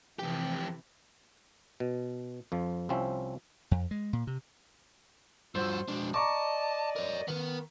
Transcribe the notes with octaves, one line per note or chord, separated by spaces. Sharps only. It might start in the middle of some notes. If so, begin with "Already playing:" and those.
F2 C3 E3 G4
B2
F2 F3
C2 F3 C4 C#4 E5
F2
G#3
A#2
C3
G2 F4 F#4 C5 E6
B2 F3 G#3 D4
D5 D#5 A5 A#5 C#6 D6
A#4 C#5
D#3 B3 B4